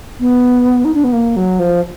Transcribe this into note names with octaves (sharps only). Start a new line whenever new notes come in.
B3
D#4
D4
B3
A#3
F#3
F3